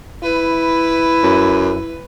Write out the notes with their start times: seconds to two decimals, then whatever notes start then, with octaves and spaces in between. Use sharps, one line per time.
0.24 E4 B4
1.23 F#2